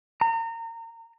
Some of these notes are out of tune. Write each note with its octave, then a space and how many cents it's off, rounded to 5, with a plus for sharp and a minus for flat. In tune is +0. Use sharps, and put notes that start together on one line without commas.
A#5 -30